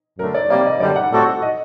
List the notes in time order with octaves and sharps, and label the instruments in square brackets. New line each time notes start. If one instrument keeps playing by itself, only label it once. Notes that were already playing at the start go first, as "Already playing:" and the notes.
[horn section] F#2 D3 A3 [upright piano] A#4
[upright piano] D5
[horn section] C3 G3 A#3 [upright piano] D5
[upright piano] D#5
[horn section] F#2 D3 G3 A#3 [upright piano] D5
[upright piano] F#5
[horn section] A2 G3 C4 F#4 A4
[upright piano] D#5